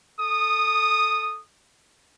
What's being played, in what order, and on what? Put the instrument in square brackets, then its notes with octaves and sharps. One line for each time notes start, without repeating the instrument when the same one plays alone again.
[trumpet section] A4 D#6